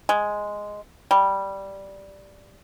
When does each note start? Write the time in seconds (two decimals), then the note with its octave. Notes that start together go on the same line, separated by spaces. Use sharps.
0.09 G#3
1.11 G3